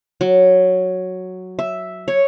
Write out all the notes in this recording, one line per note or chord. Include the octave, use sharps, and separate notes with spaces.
F#3
E5
C#5